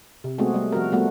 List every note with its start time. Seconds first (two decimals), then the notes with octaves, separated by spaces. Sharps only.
0.24 C3
0.38 G#3 A3 B3 C4 F#4 G#4
0.54 G3 A3
0.72 F3 F#4 A#4
0.92 G3 A3 B3 F#4